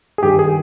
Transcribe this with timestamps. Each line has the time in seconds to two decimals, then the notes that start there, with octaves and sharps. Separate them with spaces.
0.18 G#4
0.23 G2 D#3 G4
0.39 G#4